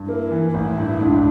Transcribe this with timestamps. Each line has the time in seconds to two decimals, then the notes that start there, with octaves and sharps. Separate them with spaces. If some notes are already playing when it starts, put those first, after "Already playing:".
Already playing: G2
0.08 A#3 E4
0.31 E3
0.54 A1 E4
0.78 G2
1.01 C#2 D4